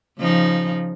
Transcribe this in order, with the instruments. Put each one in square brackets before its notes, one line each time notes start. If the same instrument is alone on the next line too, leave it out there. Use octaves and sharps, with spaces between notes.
[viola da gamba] C#3 F3 D#4